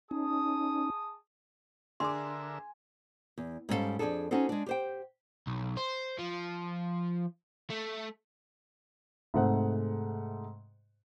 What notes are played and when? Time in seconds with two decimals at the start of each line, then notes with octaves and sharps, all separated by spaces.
0.11 C#4 D#4 G#4 A5 D#6
2.00 D3 D4 G#4 A#4 E5 G#5 C6 D6
3.38 E2
3.69 G#2 G3 C#4 E4 A4 F5
3.99 F2 B2 D4 G#4 A4
4.31 C#4 D#4 F#4 A4 C5
4.49 G#3 D4
4.66 G4 C5 G5
5.47 B1
5.77 C5
6.19 F3
7.70 A3
9.34 G#2 C3 G#3 A3 C5 F#5